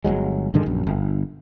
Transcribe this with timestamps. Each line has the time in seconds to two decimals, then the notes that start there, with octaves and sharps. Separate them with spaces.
0.04 G1 C#2 F#3 G#3
0.54 G2 D3 D#3 G#3
0.66 A#1 F#2
0.87 G1